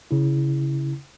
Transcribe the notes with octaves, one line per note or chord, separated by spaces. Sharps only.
C#3 E4